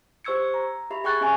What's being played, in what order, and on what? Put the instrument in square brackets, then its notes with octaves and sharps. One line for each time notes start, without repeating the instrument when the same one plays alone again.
[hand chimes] G4 C5 C#6 E6 G#6 C#7
A#5
G4 E5 B5
G#4 G5 C#6 F#6 G#6 A6
C#4 E5 G#5 C#6 F#6